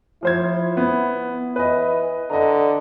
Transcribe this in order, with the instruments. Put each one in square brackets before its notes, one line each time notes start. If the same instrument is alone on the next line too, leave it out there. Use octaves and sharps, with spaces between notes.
[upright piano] F3 C5 G#6 [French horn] E4
[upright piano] B3
[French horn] E3 [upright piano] B4 D#5
[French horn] D3 [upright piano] D#5 A#5